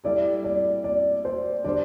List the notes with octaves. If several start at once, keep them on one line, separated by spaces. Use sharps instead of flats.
G3 E4 A4 D5
D5
D5
C5
D3 G3 D4 C5 D5